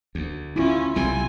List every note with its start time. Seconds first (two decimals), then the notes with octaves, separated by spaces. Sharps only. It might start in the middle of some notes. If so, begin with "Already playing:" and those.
0.15 D2
0.56 C#4 E4 F4
0.96 B1 C3 G3 C4 G#5